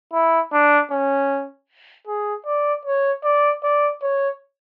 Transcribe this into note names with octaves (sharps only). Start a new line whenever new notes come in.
E4
D4
C#4
G#4
D5
C#5
D5
D5
C#5